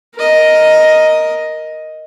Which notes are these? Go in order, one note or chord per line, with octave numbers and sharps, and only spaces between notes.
A#4 D#5